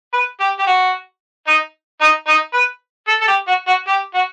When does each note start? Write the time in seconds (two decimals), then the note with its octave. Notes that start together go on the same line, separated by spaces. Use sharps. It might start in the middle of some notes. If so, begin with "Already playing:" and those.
0.13 B4
0.40 G4
0.59 G4
0.67 F#4
1.47 D#4
2.01 D#4
2.27 D#4
2.54 B4
3.08 A4
3.21 A4
3.28 G4
3.47 F#4
3.67 F#4
3.87 G4
4.14 F#4